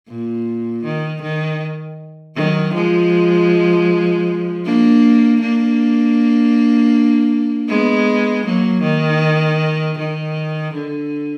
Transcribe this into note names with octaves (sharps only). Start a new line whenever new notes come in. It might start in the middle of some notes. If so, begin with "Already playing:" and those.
A#2
D#3
D#3
D#3 F#3
F3 G#3
A#3 D4
A#3 D4
G#3 B3
F#3 A#3
D#3
D#3
D3